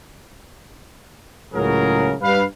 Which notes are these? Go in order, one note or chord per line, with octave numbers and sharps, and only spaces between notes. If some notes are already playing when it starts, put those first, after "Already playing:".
C#2 A2 C#3 F#3 G#4 A#4
G2 B4 F5